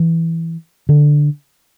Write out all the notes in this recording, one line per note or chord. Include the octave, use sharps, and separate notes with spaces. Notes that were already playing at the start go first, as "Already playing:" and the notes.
Already playing: E3
D3